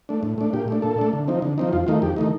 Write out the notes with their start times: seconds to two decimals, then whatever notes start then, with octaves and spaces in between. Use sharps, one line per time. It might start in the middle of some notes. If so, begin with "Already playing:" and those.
0.09 A3 D4
0.23 A2
0.38 A3 D4
0.53 A#2 G4
0.68 A3 D4
0.82 A#2 A4
0.98 A3 D4
1.13 D3
1.28 F3 C4 D#4
1.42 D3
1.58 F3 C4 D#4
1.73 F2 F4
1.87 D#3 A3 D#4 F4
2.02 F2 G4
2.16 D#3 A3 D#4